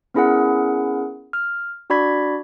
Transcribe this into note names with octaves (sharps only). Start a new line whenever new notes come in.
B3 C#4 E4 G#4 A#4 F#5
F6
D4 F#4 D5 B5 G#6 B6